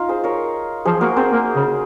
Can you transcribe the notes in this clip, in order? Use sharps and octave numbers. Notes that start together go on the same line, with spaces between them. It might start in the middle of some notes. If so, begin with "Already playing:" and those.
Already playing: D#4 F4
G#4 C5
A#4 C#5
F3 G#4 C5
A#3 F#4 A#4
C4 G#4 C5
A#3
C#3